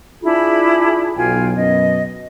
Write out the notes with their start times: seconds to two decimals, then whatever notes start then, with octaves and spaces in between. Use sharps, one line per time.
0.23 D4 E4 F4 G#4 B5
1.16 B1 F4 G5 G#5
1.57 F#2 B2 D#5